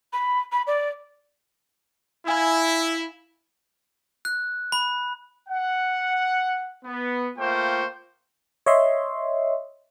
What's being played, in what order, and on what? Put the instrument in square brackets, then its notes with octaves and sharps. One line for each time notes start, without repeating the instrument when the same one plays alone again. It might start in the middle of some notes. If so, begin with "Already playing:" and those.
[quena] B5
B5
D5
[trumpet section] E4 [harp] F5 G#5 E6
[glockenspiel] F#6
B5
[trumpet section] F#5
B3
A3 A#3 F4 C5 G5 C#6
[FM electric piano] C#5 D#5 E5 C6